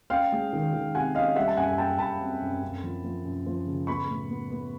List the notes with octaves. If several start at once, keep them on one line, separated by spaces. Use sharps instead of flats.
C#4 F5 G5
G#3
D#3
D#3
C3 F#5 G#5
C#4 D#5 F5
G3 E5 F#5
A5
F#2 F#5 G#5
G#5
F#2 G5 A5
F#2 A5 B5
C4
F#2
F#2
F3
F3
F#2
F3
C#3
B3 B5 C#6
A2
B3
B3